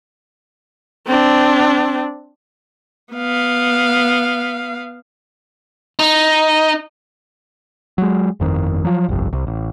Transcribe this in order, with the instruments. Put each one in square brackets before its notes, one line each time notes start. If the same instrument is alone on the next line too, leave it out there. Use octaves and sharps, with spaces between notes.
[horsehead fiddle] C4 D4
[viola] B3 F5
[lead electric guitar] D#4
[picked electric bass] F#3 G#3
G1 F2 D#3
F3 F#3
G1 C2 F2
C2
A1